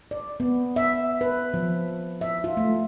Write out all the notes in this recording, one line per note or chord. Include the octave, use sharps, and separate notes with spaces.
D5
B3
E5
B4
F3
E5
F4
A3